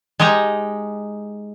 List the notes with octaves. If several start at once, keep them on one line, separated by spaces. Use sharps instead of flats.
G#3 D#4 G4 D#5 A#5